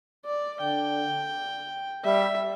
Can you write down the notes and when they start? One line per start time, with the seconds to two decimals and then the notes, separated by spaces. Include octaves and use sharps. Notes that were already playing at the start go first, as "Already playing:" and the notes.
0.25 D5
0.61 D3 G5
2.04 G3 E5